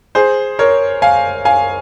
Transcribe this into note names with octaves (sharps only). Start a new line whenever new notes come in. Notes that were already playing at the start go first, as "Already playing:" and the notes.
G#4 C5
A#4 C#5
F5 G#5
F5 G#5